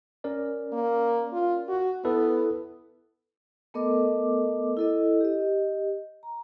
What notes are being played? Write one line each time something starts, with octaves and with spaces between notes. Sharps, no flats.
C#4 A#4 D5
A#3
F4
F#4
B3 E4 A4 B4
A3 B3 A4 A#4 D#5 D6
E4 A4 D#5
G4 D#5
A#5